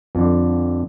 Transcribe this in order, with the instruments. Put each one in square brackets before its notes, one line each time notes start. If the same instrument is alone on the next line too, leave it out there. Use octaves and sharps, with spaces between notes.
[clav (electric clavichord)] F2 D3